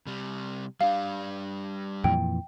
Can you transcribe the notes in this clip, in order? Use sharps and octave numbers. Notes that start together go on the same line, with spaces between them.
C3 G3
G3 D4 F5
F2 A#2 E3 G5